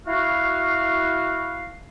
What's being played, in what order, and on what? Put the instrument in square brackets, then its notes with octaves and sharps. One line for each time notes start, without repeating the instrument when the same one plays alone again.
[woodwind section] E4 F#4 F5